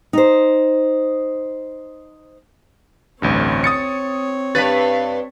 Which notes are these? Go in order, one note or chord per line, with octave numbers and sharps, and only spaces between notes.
D#4 C5
A1 D2 G2 C4 C#5
D#6 A6 C#7
G2 B4 A6 B6